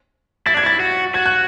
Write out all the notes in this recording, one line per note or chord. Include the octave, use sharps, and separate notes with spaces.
E4 A6
D4 G#6
E4 A6
F#4
F#4 G#6
F#6